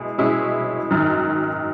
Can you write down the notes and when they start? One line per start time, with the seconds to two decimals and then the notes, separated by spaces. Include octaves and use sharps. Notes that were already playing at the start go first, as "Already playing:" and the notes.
Already playing: B2 G#3 E4 G#4
0.18 B2 G#3 C#4 E4 G#4
0.90 G#1 F#2 D#3 F#3